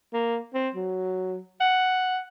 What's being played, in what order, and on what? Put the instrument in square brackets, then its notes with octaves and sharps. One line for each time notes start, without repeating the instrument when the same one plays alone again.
[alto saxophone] A#3
C4
F#3
F#5